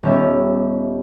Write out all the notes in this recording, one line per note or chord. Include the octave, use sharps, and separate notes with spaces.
D#1 B3 C#4 G4 E5